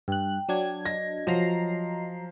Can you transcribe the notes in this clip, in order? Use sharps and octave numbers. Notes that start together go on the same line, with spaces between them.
G2 G5 F#6
F#3 D4 G#6
D#5 A#6
F3 F#3 A#5 C7